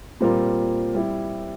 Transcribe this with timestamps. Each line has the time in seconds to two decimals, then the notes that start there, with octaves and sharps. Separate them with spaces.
0.20 A#2 G3 C4 F4 A#4
0.95 G3 C4 E4